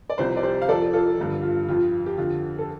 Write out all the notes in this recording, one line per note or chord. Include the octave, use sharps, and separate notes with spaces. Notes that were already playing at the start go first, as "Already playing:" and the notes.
D5
C2 C3 F3 G4 C5
D5
G4 C5
F5
F2 F3 A4 D5
F4 A4
G2 D3 F3
F4
F2 F3 F4
G4
F2 D3 F3 F4
A4